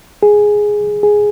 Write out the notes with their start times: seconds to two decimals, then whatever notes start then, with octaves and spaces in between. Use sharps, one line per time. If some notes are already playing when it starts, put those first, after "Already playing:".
0.23 G#4
1.03 G#4